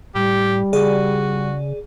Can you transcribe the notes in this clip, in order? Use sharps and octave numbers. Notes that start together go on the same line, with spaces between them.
A2 G3 G4
C#3 F#4 G#4 D5